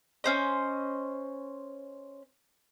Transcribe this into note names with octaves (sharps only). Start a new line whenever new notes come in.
C#4 C5 D#5